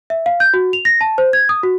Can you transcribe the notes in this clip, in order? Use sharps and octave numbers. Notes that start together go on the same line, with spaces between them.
E5
F5
G6
F#4
F7
A#6
A5
C5
G#6
D#6
F#4